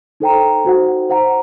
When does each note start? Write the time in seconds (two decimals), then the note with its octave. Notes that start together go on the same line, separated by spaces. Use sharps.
0.20 D#4 A4 C5 G5 A#5
0.65 D#4 F#4 C5 F#5
1.10 C5 F#5 A#5